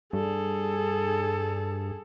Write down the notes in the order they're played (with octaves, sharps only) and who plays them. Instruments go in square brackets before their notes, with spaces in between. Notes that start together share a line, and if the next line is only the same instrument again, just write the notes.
[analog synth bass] G2 [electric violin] G#4 A4